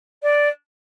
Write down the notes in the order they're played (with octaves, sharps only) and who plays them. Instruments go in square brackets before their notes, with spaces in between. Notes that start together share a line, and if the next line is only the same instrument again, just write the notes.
[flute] D5